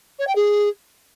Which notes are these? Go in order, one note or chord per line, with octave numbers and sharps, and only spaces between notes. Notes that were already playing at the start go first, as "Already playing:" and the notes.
C#5
G5
G#4